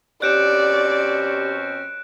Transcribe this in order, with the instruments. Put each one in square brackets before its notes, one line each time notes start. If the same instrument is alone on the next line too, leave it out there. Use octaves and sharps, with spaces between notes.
[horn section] B2 C4 C#4 [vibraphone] G4 [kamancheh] D5 [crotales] F#6 D7 E7